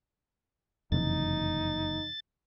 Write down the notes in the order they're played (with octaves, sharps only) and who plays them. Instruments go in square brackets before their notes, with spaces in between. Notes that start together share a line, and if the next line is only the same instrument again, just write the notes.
[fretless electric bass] F#1 [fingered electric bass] F2 C3 E3 [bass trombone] D#4 [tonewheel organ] A6